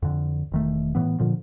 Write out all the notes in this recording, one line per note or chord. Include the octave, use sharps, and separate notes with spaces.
F2 D3
E1 D#3 A3
A2 E3 B3
A#2 D3 F3